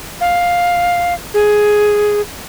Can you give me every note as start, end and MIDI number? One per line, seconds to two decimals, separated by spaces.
0.21 1.14 77
1.34 2.21 68